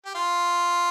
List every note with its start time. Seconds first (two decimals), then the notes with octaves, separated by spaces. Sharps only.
0.05 G4
0.15 F4